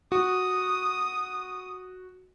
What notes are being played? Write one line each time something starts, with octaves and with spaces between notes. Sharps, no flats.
F#4 D#6